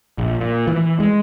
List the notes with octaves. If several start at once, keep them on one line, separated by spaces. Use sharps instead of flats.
A#1
A#2
E3
G#3